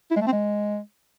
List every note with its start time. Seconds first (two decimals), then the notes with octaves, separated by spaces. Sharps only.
0.11 E4
0.16 G#3
0.22 A3
0.27 C4
0.33 G#3